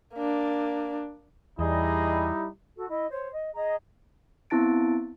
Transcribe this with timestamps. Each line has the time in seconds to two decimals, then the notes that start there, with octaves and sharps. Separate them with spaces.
0.14 A#3 D4
1.59 E2 G3 D#4 E4 G#4 D#5
2.76 F#4 A4
2.89 E4 D#5
3.10 C5 C#5
3.32 D#5
3.54 G#4 D#5 A#5
4.50 B3 C4 E4 A5 A6 D7